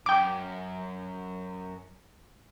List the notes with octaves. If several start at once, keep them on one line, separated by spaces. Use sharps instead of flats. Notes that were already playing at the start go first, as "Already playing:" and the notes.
F#2 G5 D6